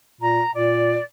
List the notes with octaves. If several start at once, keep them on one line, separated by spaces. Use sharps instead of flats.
A#2 A#5
A#2 D5